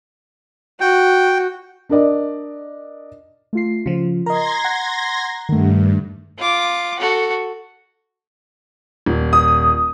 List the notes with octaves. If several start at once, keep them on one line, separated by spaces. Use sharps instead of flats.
F#4 G5
D4 A#4 D5 D#5
A3 F4 C7
C#3 F3 F4
A#4 D#5 A#5 C6 G#6 A#6
F#5
G2 D#3 A3
F4 D6
F#4 A4
D#1
D#6